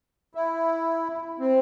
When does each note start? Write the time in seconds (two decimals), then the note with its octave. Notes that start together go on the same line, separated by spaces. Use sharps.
0.35 E4
1.40 C4